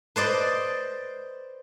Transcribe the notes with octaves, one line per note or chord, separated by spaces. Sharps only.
B4 C5 D5 D#5